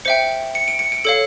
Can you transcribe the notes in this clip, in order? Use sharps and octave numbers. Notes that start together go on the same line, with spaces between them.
C5 E5 G5 C#7
C#7
D7
C#7
D7
A4 C#5 F5 C#7